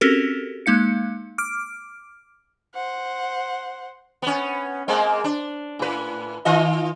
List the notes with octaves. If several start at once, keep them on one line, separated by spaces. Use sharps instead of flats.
C4 C#4 F#4 G4 A4 A#4
G#3 A#3 D#4 F5 C#7
D6 F6 D7
C5 F#5
B3 C#4
G#3 A#3 C4
D4
A2 B4
D#3 F4 D#5